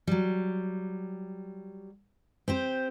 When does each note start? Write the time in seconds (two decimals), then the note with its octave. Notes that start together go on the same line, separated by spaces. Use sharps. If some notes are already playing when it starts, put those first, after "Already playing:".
0.07 F#3 G3
2.48 C4 G4 C5